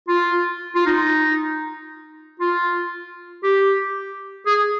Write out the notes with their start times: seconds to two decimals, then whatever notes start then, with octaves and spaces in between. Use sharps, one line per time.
0.08 F4
0.75 F4
0.86 D#4
2.40 F4
3.44 G4
4.47 G#4